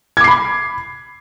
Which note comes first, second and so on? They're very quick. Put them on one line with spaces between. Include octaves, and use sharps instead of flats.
G#6 D6 C7 B5